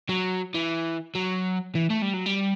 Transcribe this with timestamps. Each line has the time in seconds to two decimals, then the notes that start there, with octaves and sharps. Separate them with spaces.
0.09 F#3
0.54 E3
1.15 F#3
1.75 E3
1.90 A3
2.02 G3
2.14 F#3
2.26 G3